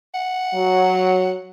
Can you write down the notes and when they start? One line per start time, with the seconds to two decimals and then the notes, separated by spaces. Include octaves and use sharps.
0.15 F#5
0.55 F#3